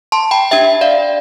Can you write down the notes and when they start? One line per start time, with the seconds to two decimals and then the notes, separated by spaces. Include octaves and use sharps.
0.12 A5 C6
0.31 G5 B5
0.51 D4 G4 E5 G5
0.81 D5 F5